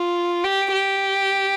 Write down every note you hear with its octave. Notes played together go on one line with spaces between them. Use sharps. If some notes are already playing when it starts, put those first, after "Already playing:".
Already playing: F4
G4
G4